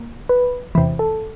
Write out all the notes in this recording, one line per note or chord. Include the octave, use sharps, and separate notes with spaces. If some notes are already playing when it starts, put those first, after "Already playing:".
Already playing: A#3
B4
E2 C3 E3
A4